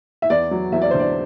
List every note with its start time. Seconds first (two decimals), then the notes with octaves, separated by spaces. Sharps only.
0.22 E5
0.30 E2 D5
0.51 F#3
0.72 E2 E5
0.82 D5
0.91 D3 C5
0.99 D5